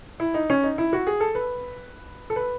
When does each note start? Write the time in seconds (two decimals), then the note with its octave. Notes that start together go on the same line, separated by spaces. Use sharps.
0.20 E4
0.34 D#4
0.50 C#4
0.63 D#4
0.78 E4
0.93 F#4
1.07 G#4
1.20 A4
1.35 B4
2.30 A4
2.36 B4